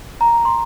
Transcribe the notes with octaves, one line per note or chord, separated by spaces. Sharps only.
A#5
C6